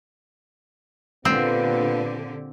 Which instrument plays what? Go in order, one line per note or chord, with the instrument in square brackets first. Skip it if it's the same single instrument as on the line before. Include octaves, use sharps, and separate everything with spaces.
[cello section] A#2 D3 G4 [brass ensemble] B3 F4 B4 [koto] C4